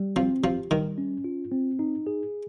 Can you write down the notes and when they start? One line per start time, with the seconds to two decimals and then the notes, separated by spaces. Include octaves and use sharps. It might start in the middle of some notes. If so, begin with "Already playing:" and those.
Already playing: G3
0.16 F3 C4
0.43 F3 G4
0.71 D#3 G3
0.98 C#4
1.24 F4
1.51 C4
1.79 D#4
2.07 G#4